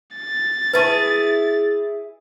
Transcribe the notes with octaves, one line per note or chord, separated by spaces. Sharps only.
A6
E4 G#4 B4 A5 C#6